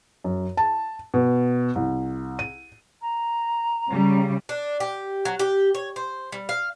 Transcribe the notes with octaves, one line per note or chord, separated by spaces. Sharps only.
F#2
A5
B2
C2
D#7
A#5
C#3 G3
D4
G4
F#3
G4
C#5
C5
G3
F5